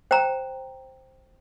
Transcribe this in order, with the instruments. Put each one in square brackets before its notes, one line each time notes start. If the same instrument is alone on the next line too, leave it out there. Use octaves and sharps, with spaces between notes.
[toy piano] C5 G5 A#5